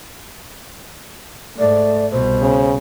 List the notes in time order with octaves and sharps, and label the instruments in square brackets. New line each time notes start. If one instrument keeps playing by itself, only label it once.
[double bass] G#2 [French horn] A3 [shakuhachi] D5
[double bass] C2 B2 [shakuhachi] C5
[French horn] C#3